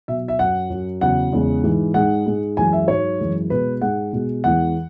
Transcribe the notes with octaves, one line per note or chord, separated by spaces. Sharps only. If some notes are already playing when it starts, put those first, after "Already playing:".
B2 F#3 E5
E5
F#2 F#3 F#5
F#2 F#3
E2 C#3 F#3 F#5
E2 C#3 G#3
G#2 E3 G#3
G#2 G#3 F#5
G#2 G#3
F#2 E3 G#3 G#5
E5
G#2 F#3 C#5
F#2 E3 G#3
B2 G#3 B4
G#2 G#3 F#5
B2 G#3
E2 E3 G#3 F#5